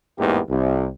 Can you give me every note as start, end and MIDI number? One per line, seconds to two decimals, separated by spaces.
0.19 0.39 33
0.19 0.39 40
0.19 0.39 44
0.19 0.39 58
0.19 0.39 59
0.19 0.39 67
0.50 0.88 36